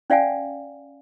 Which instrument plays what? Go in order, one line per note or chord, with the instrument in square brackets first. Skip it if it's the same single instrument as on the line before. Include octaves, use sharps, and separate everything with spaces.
[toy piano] C#4 D5 F5 F#5 G#5